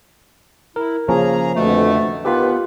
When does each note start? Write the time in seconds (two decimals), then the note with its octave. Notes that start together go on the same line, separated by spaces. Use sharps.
0.76 E4 A#4
1.09 C#3 F3 A#3 C#4 G#4 A#5
1.56 F2 B2 D3 A3
2.25 D#2 B3 F4 G4 B4